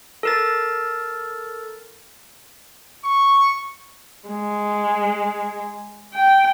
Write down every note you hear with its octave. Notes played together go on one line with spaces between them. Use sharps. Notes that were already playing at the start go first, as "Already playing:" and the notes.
A4 A#4 A6
C#6
G#3
G5